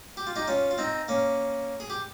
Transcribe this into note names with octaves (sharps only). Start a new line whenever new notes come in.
G4
F4
D#4 G4
C#4 F4
F4
C4 D#4
A#3 C#4
G#4
G4